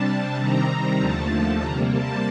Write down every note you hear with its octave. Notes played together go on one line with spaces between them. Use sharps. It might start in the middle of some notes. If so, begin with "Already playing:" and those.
Already playing: C3 G3 D4 A5
C3 D#3 G3 C4 A#5
D#2 D3 F3 A3 A5
C3 G3 A#3 A#5
A5